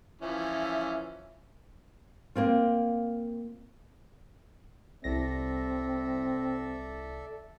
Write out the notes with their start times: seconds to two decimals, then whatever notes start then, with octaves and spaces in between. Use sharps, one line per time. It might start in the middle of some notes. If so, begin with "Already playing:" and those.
0.22 E3 F3 C#4 E5
2.36 A#3 C4 F4
5.04 C2 C4 A4 D5 E5 A#6